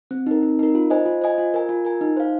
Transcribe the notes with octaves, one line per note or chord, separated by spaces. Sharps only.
C4
D#4 A#4
C4
D#4 A#4
F4
C5 D#5 G#5
F4
C5 D#5 G#5
F4
A#4 G#5
F4
A#4 G#5
D#4
C5 F5